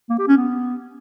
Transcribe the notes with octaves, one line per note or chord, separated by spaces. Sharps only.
A#3
G4
C#4
B3